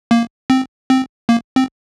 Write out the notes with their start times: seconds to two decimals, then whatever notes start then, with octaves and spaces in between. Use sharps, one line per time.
0.11 A#3
0.50 C4
0.90 C4
1.29 A#3
1.56 C4